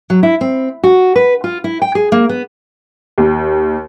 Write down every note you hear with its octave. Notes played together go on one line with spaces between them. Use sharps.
F#3
E4
C4
F#4
B4
F4
E4
G5
G#4
A#3
B3
D#2